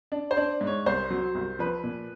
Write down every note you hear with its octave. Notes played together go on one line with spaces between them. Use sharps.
D4
C5
D4
G#2
C#5
C2 C5
F#3
C2
F3 B4
A#2